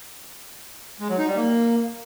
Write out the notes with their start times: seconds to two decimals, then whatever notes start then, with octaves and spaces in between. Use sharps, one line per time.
1.00 G#3
1.09 F#3
1.18 D#4
1.27 G3
1.36 A#3